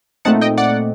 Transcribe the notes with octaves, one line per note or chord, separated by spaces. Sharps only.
A#2 A3 C4 D#4 F#5 A5
D#5 G5
D5 F#5